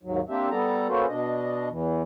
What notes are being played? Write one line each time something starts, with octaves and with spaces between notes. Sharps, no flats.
D#2 G#2 F#3
A#3 C4 D4 G4 E5
G3 B3 A4 D5 A#5
A#3 C#4 F#4 A4 B4 C5
B2 D4 D#5
E2 E3